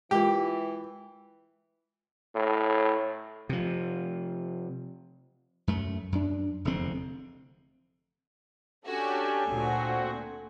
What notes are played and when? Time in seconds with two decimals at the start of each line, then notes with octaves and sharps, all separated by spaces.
0.11 E3 G#3 F4 G4 A#4 G5
2.35 A2
3.49 C3 F3
5.67 F#2 A3
6.12 F#2 D4
6.65 F1 E2 D3 C4
8.85 C#4 D4 F#4 G4 A4 G#5
9.49 D2 A#2 C4 F#4